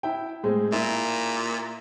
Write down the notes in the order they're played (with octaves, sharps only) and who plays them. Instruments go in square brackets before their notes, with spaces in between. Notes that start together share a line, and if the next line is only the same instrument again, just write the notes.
[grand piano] E4 G5
A2 G#3 C4
[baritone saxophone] A#2 [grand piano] E4